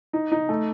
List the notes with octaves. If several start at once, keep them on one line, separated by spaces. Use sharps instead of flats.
D#4
D#4
A3